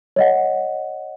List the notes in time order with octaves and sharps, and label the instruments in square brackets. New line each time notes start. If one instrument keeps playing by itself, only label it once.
[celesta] C#5 D#5 F#5